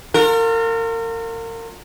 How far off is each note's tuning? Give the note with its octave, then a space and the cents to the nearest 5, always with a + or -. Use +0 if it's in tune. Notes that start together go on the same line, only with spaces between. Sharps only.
F4 +35 A#4 -35